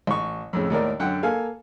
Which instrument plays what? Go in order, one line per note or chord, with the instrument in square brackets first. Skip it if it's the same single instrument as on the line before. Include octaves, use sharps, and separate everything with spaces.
[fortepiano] A1 C#6
F2 A2 C#3
D#2 A2 A#4 D5
F#2 D3 F#5 G5
A#3 A4 F5 G#5